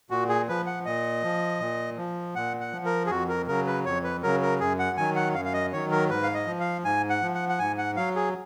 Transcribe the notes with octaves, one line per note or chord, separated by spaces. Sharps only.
A#2 F#4
G#4
F3 B4
F#5
A#2 D#5
F3
A#2
F3
A#2 F#5
F#5
F3
A#4
G#4
F2 F#4
A#4
C#3 F#3 A#4
B4
F2 C#5
B4
C#3 F#3 A#4
A#4
F#2 G#4
F#5
D#3 F#3 G#5
F#5
F#2 F5
F5
D#5
D#3 F#3 C#5
A#4
G#2 B4
F5
D#5
F3
F5
G#2 G#5
F#5
F3
F#5
F#5
G#2 G#5
F#5
F#3 F5
G#4